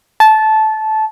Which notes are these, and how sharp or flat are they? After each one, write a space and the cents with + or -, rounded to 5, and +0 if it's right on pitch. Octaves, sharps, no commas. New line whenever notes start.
A5 -15